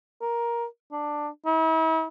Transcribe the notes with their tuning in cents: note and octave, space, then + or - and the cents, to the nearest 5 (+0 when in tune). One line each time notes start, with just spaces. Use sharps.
A#4 +10
D4 +10
E4 -40